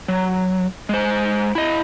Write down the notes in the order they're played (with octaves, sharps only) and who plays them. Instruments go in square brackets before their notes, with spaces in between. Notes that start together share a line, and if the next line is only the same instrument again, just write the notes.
[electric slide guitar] F#3
G#3 C5
E4 D#5